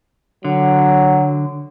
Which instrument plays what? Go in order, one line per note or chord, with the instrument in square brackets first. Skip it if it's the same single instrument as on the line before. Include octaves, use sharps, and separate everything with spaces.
[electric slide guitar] D3 [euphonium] F#3